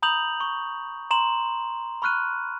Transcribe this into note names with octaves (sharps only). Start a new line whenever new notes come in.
A#5 B5 D#6 G6 F7 F#7
C#6
A#5 C6 E7 F#7
B5 C#6 F6 F#6 D#7